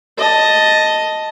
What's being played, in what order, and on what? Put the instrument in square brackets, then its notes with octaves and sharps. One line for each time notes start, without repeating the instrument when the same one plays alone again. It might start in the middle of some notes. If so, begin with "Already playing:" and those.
[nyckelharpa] D#5 A5